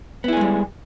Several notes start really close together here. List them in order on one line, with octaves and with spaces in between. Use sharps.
B3 E4 G#4 G#3 G3